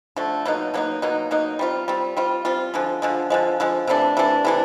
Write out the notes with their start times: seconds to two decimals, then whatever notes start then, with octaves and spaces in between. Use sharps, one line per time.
0.16 D3 F3 A3
0.46 B2 F#3 A#3 D#4
0.74 B2 F#3 A#3 D#4
1.02 B2 F#3 A#3 D#4
1.31 B2 F#3 A#3 D#4
1.59 G3 C4 F4
1.88 G3 C4 F4
2.17 G3 C4 F4
2.45 G3 C4 F4
2.74 D3 F3 G#3
3.02 D3 F3 G#3
3.30 D3 F3 G#3
3.60 D3 F3 G#3
3.87 C3 E3 A3 D4
4.17 C3 E3 A3 D4
4.45 C3 E3 A3 D4